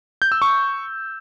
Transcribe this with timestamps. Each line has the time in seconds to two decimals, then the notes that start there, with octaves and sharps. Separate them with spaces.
0.22 G6
0.32 E6
0.42 C#6